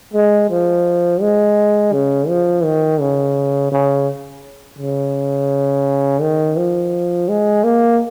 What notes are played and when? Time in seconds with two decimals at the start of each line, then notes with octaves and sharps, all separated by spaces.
0.14 G#3
0.49 F3
1.21 G#3
1.93 C#3
2.29 F3
2.64 D#3
3.01 C#3
3.72 C#3
4.79 C#3
6.21 D#3
6.57 F3
7.29 G#3
7.64 A#3